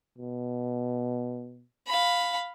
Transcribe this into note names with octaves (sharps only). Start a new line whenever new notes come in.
B2
F5 B5